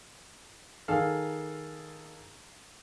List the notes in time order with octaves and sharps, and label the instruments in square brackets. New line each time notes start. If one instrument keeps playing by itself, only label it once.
[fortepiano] D#3 G#4 A4 F5